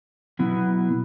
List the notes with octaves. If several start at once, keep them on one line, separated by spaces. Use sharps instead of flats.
B2 F#3 B3 E4